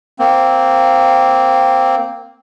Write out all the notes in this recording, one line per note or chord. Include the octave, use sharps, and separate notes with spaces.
A#3 C4